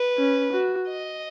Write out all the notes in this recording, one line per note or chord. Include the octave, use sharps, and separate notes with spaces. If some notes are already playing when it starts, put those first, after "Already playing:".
Already playing: B4
C#4
F#4
D#5